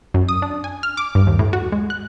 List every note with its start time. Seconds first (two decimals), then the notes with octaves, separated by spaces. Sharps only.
0.14 F#2
0.29 D#6
0.42 D4
0.64 G#5
0.83 F6
0.97 D6
1.15 G2
1.27 D#2
1.39 A2
1.53 F#4
1.72 G#3
1.90 F#6